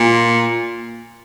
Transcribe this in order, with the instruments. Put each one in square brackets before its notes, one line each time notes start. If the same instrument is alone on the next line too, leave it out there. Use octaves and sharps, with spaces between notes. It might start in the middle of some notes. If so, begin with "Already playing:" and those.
Already playing: [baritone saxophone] A#2